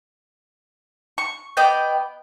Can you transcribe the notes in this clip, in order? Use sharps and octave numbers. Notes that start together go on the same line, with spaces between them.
C#6
B3 D5 D#5 G5